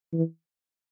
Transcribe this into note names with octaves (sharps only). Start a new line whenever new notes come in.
E3